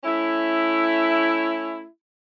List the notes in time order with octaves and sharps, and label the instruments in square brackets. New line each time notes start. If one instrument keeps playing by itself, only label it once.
[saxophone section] A3 C#4 E4